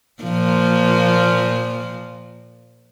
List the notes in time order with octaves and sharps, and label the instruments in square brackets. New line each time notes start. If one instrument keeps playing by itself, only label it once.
[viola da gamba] A#2 F3 A#3